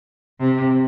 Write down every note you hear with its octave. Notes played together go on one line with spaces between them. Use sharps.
C3